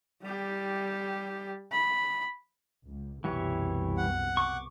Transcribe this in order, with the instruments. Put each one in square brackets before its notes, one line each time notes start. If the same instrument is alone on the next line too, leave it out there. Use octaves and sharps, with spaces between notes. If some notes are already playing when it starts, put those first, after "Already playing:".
[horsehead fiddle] G3 G4
B5
[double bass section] C#2
[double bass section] C2 F#2 B2 [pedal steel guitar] E3 G3 C#5
[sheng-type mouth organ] F#5
[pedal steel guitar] C#6 D6